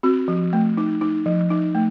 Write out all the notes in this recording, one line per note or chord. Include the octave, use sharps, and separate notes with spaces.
C4 F#4
F3
A3
D#4
D#4
F3
D#4
A3